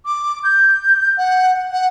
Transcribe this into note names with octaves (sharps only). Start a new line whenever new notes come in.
D6
G6
F#5
F#5